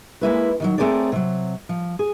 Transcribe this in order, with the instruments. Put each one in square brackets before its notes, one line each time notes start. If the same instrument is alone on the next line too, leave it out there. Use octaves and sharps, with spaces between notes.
[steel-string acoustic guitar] G#3 A#3 E4 B4
D#3 E3 F#3
A3 C4 G#4 A#4 C#5 D5
C3 F#3
F3
G#4